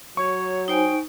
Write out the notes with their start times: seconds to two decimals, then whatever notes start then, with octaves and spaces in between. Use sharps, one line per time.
0.17 F#3 C#5 C#6
0.68 D#4 C5 G5 G#5